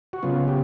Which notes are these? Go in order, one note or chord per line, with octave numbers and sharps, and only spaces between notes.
F#4
C#3 F#3 B3 F4
G4